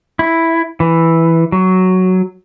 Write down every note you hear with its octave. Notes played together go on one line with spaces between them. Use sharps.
E4
E3
F#3